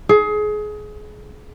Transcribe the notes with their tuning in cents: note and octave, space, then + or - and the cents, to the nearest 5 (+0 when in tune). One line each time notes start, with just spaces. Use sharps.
G#4 +25